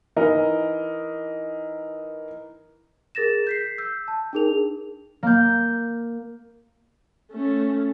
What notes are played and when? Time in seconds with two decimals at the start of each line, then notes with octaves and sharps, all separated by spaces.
0.16 E3 D#4 A#4 D#5
3.15 G#4 A#4 A6 A#6 E7
3.47 G6 B6 C7
3.78 E6 G6
4.08 A5
4.33 D4 D#4 G#4 A#4 F7
5.23 A#3 G6
7.32 A3 C#4